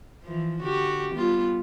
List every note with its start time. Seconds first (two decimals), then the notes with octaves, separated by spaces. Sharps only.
0.24 E3 F3
0.62 D3 F#4 G4
1.14 G3 B3 F4